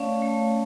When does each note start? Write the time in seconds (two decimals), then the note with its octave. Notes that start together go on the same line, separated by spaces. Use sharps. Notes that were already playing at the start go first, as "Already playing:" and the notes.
Already playing: A3 C#4 C#5 D5 F5
0.22 A3 C#5